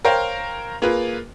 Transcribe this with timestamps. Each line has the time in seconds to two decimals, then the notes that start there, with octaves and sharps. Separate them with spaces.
0.05 A#4 C5 C#5 F5 G5
0.82 A#3 F4 G#4 B4